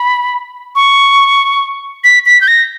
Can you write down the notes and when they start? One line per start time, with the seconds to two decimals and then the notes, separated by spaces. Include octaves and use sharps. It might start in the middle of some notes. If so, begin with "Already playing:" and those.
Already playing: B5
0.75 C#6
2.04 B6
2.26 B6
2.41 G6
2.48 A#6